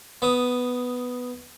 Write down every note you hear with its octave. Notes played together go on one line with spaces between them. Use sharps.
B3 D#6